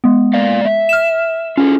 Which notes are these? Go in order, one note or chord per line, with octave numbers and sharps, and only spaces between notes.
G#3 B3
A#3 D5 F5
E5
F6 E7
C#4 F4 G#4 A4